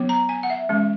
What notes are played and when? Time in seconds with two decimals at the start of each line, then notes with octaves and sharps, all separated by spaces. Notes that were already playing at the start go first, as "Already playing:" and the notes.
Already playing: F#3 B3
0.09 A#5
0.29 G#5
0.43 F#5
0.50 E5
0.69 E3 G#3 C#4